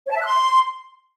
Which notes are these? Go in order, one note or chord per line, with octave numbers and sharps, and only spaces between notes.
C#5
A5
E5
F#6
C6